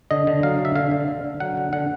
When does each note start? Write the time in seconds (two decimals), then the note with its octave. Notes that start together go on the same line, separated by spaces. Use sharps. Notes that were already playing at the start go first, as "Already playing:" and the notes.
0.11 D3 D#5
0.27 D3
0.43 F#3 F5
0.59 D3
0.65 E5
0.75 D3 F5
0.91 D3
1.08 D3
1.24 D3
1.40 F#3 F#5
1.57 D3
1.73 D3 F#5